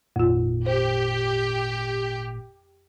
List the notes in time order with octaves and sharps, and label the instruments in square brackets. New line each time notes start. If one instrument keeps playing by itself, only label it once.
[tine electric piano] G#1 A#2 [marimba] F2 F4
[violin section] G4 [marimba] C5